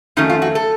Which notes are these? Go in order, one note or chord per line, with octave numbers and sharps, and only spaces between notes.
F2 D#3 F#3 A3 C#4 D#4
F4
F#4
A4